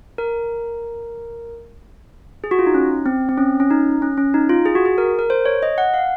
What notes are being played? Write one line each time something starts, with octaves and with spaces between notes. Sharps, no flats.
A#4
G#4
F#4
F4
D#4
C#4
C4
C4
C#4
C#4
D#4
C#4
C#4
D#4
F4
G#4
F#4
G#4
A#4
A#4
C5
C#5
D#5
F#5
F5